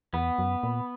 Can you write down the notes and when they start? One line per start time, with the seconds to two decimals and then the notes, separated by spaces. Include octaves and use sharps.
0.13 E2 B3
0.39 F#2
0.63 A#2